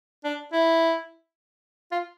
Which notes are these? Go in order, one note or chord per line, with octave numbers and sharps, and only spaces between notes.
D4
E4
F4